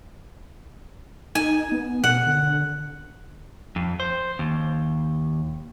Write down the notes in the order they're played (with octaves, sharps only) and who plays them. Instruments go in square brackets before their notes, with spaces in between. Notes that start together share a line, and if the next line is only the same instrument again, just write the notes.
[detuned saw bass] D#4 [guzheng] G#5
[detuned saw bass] B3
[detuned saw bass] B2 [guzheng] F#5
[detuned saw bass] D3
[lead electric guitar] F2
C5
D#2